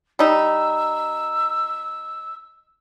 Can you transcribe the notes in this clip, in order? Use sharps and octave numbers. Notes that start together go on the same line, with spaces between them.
G3 D#4 E6